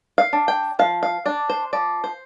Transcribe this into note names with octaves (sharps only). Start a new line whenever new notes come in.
F5
D4
G5
F3 F5
F5
D4 D5
C5
F3 D5
C5